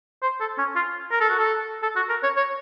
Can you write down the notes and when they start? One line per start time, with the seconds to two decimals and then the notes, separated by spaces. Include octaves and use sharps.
0.22 C5
0.40 A4
0.58 C#4
0.76 F4
1.11 A#4
1.21 A4
1.30 F#4
1.38 A4
1.83 A4
1.96 F#4
2.09 A#4
2.23 C#5
2.37 C#5